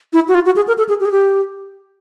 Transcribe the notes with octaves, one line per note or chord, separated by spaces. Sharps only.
E4
F#4
F4
F#4
G#4
A#4
A4
G#4
G4
G#4
G4